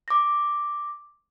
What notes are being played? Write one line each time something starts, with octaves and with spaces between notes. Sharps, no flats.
D6 A#6